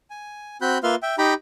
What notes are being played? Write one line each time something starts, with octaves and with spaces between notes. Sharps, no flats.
G#5
C4 F#4 B5 F#6 G6
A#3 F4 B4 E5 C6 F6
E5 G5
D#4 G4 G5 A#5 B5